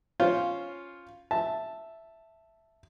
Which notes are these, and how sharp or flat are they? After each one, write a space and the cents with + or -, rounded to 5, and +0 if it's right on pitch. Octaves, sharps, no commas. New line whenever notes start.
C#4 +0 F4 +0 C5 +0
E5 +0 A5 +0